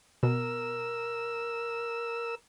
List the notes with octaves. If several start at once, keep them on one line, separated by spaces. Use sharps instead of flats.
B2 A#4 E6